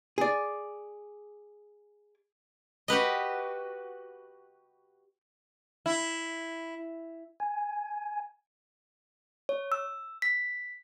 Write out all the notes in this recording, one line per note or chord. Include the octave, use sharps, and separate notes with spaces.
G#4 D5
F#4 G4 B4 D#5
E4
G#5
C#5
E6
B6